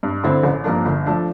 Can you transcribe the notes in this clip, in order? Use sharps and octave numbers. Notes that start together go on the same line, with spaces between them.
G2
D3 A3 C4 E4
A1
G2 F3 A#3 D4
G1
F3 A3 D4